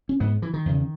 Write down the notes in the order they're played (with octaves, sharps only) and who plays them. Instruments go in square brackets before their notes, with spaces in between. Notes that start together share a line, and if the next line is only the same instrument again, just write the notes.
[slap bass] C#4
G#2 B3
E3
D#3
E2 C#3